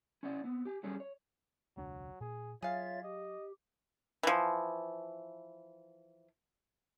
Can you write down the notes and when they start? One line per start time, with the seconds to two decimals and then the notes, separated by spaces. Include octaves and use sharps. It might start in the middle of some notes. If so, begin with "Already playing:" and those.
0.23 C#4 E4 D5 F#5
0.44 B3 C4
0.65 G4 G#5
0.83 F#3 G3 C#4 G#4 A4
1.00 C#5
1.77 E1 C#2 F#3 D4
2.21 A#2 G#4
2.62 F#3 F4 G#4 C#5 E5 F5 A6
3.03 G4 D#5
4.23 E3 F3